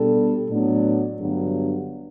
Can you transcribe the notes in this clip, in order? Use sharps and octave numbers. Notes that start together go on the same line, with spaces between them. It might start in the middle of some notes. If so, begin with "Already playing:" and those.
Already playing: B2 G3 D4 A4
A2 F#3 B3 D4
G1 G2 D3 F#3